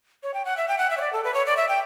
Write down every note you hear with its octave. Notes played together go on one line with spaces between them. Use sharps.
C#5
G5
F#5
E5
G5
F#5
E5
C#5
D5
A4
B4
C#5
D5
E5
G5